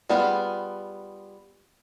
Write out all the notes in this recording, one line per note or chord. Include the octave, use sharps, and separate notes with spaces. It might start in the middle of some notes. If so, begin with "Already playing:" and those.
G3 B3 D4 F4 G#4